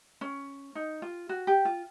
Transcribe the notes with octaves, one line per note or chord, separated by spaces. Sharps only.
C#4
D#4
F4
F#4
G4
F4